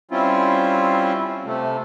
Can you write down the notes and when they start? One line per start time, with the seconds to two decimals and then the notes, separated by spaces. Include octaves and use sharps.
0.11 G3 C4 C#4 E4 F4
1.45 C3 A3